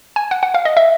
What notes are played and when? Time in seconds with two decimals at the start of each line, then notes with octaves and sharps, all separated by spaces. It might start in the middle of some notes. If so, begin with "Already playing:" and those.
0.16 G#5
0.31 F#5
0.43 F#5
0.54 F5
0.65 D#5
0.77 E5